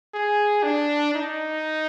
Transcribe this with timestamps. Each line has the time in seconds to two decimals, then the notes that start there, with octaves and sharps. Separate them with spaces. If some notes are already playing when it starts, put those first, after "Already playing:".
0.14 G#4
0.63 D4
1.14 D#4